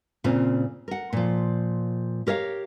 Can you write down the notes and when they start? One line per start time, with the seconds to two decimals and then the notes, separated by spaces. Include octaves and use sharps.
0.24 A#2 C#3 C4 F4
0.88 A#4 F#5
1.13 A#2 F3
2.27 G4 A#4 C#5 E5 F5